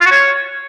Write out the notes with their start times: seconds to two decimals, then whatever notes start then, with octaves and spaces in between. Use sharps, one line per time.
0.01 F4
0.06 F#4
0.11 C#5